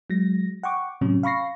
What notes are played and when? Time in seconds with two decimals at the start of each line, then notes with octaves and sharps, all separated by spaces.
0.10 F#3 G#3 A#6
0.63 F#5 G5 C#6 D6
1.01 A2 C3 F#3 C#4
1.23 F5 B5 C#6 A#6 C7